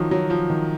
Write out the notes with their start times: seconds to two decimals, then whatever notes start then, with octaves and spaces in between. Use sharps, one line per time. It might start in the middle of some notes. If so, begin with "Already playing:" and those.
Already playing: D#3 F3 F#3
0.11 F#3
0.30 F3
0.50 D#3